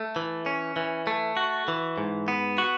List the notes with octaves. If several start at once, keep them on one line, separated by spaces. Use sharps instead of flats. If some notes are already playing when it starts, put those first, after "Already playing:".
Already playing: A3
E3
C#4
E3
A3
F#4
E3
G#2
B3
F#4